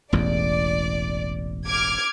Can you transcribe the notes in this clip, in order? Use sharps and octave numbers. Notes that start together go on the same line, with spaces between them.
E1 A1 E2 D5
D6 F6 G#6